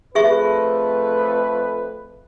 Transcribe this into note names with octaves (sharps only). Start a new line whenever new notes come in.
F2 A3 G#4 B4 E5 C#6